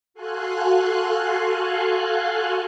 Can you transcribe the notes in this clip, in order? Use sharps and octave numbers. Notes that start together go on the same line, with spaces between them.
F#4 A4 F5 G#5 C6 F#6